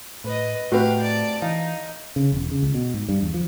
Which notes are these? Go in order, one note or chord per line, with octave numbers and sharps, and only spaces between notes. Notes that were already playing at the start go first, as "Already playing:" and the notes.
A2 B4 D#5
A2 A3 C4 F#4 G4 B4 F5
D5 A5
E3 D#4 F5
C#3
E1
C#3
C#2
B2
G#2
G2
E2
F3